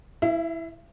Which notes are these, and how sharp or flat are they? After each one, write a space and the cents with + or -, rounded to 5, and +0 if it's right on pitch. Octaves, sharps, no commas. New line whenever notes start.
E4 +0 E5 +45